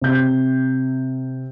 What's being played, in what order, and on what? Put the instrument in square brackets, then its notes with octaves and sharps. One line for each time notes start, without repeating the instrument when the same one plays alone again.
[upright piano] C3 G6